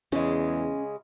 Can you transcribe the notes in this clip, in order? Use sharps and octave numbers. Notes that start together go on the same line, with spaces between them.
E2 C#3 G#3 C#4